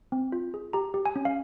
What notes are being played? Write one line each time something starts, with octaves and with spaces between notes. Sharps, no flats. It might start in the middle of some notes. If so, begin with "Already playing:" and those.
C4
F4
G#4
G4 A#5
G4
G#5
C#4
F5